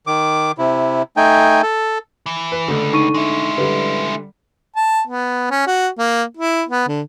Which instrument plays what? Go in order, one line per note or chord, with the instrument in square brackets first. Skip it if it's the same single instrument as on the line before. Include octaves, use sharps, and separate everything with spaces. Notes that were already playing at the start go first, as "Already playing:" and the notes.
[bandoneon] D#3 D6
C3 E4
A3 D#4 G5 G#5
A4
[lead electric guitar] E3
[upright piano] B4
[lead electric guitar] C#2 [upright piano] D3 A3 D4
[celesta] D#4 C#6 D#7
[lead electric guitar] G#3 E4
[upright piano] D3 G3 [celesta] B4
[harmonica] A5
B3
C#4
F#4
A#3
E4
B3
D3